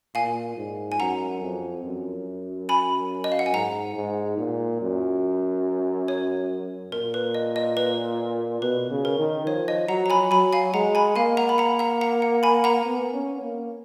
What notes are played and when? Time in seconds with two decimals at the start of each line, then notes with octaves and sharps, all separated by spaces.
0.15 A#2 F5 G#5
0.57 G#2
0.92 G#5
1.00 F#2 F#5 A#5
1.42 F2
1.85 F#2
2.69 G#5 B5
3.24 D#5
3.32 F5
3.39 F#5
3.46 G#5
3.54 G#2 F#5 A#5
3.96 G#2
4.38 A#2
4.81 F#2
6.08 C#5
6.92 A#2 A#4
7.14 B4
7.34 D#5
7.56 D#5
7.77 B4
8.62 B2 B4
8.90 C#3
9.05 A#4
9.19 D#3
9.47 F3 C#5
9.68 D#5
9.89 F#3 F#5 A#5
10.06 A#5
10.10 G#5 B5
10.31 F#3 G#5 B5
10.53 F5 G#5
10.74 G#3 F#5 A#5
10.95 G#5 B5
11.16 A#3 F5 G#5
11.37 F#5 A#5
11.49 B5
11.58 F#5 A#5
11.79 F#5 A#5
12.01 F#5 A#5
12.22 F#5
12.43 G#5 B5
12.64 F#5 A#5
12.86 B3
13.14 C#4
13.42 A#3